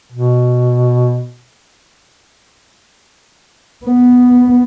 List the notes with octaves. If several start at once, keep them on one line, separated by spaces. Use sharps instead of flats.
B2
B3